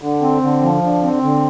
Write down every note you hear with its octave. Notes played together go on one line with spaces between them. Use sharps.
D3
C4
D3
F3
D3
C4
D3